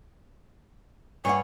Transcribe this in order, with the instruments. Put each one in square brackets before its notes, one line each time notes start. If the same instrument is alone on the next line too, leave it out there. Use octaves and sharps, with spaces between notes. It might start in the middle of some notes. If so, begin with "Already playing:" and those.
[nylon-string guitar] G2 D4 F#5 [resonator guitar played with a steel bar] C#5 [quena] G#5